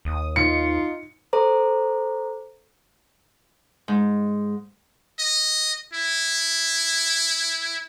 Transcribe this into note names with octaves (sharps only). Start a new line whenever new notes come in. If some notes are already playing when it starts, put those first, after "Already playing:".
D#2 D#6
D#4 F4 C#7
A4 C5 A#5 D6
G#2
D#5
E4